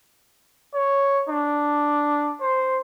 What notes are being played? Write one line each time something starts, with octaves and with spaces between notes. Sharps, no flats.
C#5
D4
C5